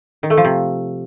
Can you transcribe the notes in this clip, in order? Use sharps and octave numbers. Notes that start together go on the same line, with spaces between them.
D#3
A3
F3
C3